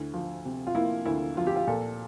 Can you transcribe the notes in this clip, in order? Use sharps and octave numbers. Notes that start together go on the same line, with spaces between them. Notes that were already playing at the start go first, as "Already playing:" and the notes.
Already playing: D2 E4
F3
C3
F4
A#3 E4
D2 E4
F3 F4
G4
F4
A#2 A4